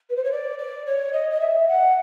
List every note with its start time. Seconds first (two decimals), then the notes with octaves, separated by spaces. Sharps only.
0.10 B4
0.16 C5
0.24 C#5
0.32 D5
0.58 D5
0.86 C#5
1.13 D#5
1.30 D#5
1.40 E5
1.68 F#5